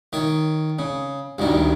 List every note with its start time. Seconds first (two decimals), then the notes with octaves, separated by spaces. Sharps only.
0.13 D#3 C#5
0.79 C#3
1.38 A1 D2 G2 D#3